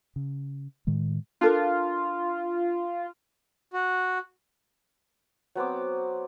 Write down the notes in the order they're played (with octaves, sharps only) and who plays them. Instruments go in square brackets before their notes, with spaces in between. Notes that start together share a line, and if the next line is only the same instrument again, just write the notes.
[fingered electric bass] C#3
A2 D#3 G#3
[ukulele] D4 A4 A#4 [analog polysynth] F4
[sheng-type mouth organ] F#4
[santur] F#3 B3 C4 D6